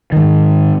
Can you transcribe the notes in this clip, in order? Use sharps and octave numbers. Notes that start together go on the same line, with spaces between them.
G#2 D#3